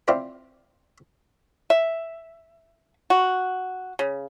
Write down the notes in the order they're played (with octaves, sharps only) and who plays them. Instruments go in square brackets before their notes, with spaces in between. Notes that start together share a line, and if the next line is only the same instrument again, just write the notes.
[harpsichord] C4 E4 F4 C5 D5 G5
[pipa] E5
F#4
C#3